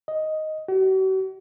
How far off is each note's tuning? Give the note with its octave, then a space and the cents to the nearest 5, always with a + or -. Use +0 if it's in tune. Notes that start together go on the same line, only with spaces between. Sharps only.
D#5 +5
F#4 +45